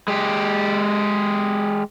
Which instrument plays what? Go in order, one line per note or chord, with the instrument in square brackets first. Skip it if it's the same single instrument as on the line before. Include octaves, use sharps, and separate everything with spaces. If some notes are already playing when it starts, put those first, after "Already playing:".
[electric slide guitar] G#3 G4